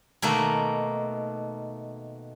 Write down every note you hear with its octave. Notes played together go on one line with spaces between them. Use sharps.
B2 D#3 A3 A#3